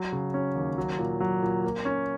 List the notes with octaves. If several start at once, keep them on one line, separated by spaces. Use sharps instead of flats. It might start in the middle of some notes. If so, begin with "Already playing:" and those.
Already playing: F#3
C#3
C#4
D#2
F#3
A#2
F#3
A#2
A#3
C#4